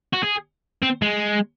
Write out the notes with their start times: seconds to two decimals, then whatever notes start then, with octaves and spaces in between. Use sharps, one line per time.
0.13 F#4
0.23 G#4
0.83 C4
1.02 G#3